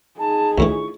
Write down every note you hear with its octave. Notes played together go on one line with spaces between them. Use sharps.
D#4 G#4 A5
D2 A2 E3 E4 F4 C#6